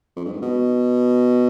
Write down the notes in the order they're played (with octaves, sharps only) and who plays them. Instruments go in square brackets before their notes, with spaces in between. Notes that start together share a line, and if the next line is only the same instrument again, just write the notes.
[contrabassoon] F2
G2
G#2
B2